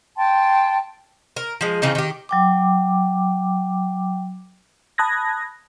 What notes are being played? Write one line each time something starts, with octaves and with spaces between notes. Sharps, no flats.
G5 A5 C6
A#4
F3 G#3
C#3 E3 C4 D#4
D#3 G4
F#3 G5 D6
A5 B5 D#6 F#6 G#6 A#6